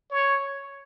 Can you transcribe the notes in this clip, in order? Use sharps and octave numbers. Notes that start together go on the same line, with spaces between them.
C#5